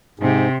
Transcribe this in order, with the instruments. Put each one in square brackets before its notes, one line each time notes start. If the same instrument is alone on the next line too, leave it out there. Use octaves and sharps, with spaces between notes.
[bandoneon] G#2 [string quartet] C3